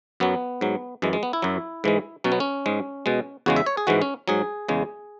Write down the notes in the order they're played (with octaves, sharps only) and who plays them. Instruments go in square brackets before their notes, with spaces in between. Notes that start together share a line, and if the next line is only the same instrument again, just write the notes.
[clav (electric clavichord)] F#2 F#3 B3
G#2 F#3
F#2 E3 G#3
G#3
B3
E4
F#2 F#3
G#2 E3 G#3
B2 F#3 C#4
B3
C#4
G#2 G#3
B2 G#3
E2 C#3 G#3 F#4
E5
C#5
G#4
G#2 E3 G#3 F#4
C#4
G#2 F#3 G#4
E2 C#3 G#3